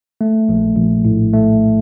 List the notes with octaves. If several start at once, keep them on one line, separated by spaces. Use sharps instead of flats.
A3
A#1
A#1
A2
A3